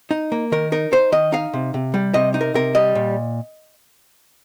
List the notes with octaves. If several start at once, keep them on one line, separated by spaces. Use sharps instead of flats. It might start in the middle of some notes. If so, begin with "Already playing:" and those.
D#4
A#3
D#3 A#4
D#4 A#4
D#4 C5
D#3 D#5
D#4 F5
C3
C3
G3
C3 D#5
D#4
A#4
C3 A#4
G3 D#5
A#2